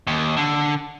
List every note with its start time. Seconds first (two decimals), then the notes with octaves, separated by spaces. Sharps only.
0.07 D#2
0.37 D3